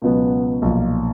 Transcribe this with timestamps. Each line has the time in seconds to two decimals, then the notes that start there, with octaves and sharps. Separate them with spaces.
0.02 C#2 B2 F#3 B3
0.62 B1 A#2 F3 A#3